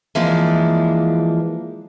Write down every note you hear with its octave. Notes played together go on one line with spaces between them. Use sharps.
E3 F3 G#3 A#3 D4